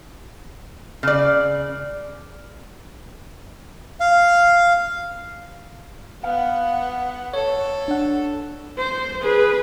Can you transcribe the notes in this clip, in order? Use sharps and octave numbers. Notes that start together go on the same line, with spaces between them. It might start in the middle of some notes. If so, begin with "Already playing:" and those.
C#3 D5
F5
B3 F5 F#5
A4 C#5
D4 F#5
C5
G#4 B4